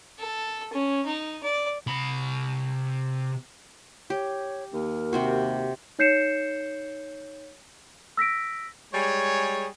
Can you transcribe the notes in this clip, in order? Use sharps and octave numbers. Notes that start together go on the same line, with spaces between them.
A4
C#4
D#4
D5
C3 B5
G4 C#5
D#2 A#4
C3 C4 F#4
D#4 C#5 G6 C7 C#7 E7
E6 A#6 B6 D7
G3 G#3 G#4 C#5